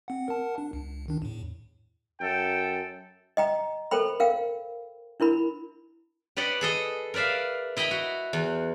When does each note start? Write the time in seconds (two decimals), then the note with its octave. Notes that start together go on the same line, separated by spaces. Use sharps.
0.08 C4 F#5
0.28 A#4 F#5 A5
0.58 D4
0.73 C#2
1.08 D#3 D4
1.22 E2 A2
2.21 F#2 A4 G5
3.37 D#5 G5 A#5
3.91 A4 A#4 C5 G5 B5
4.20 A#4 F5 G5
5.20 D4 E4 A#4 B5
6.37 G4 B4 D5 D#5 F#5
6.61 G#4 A4 D#5
7.14 A#4 B4 D5 E5 F5
7.77 E4 D#5 G5 A#5 B5
7.91 F#4
8.33 E2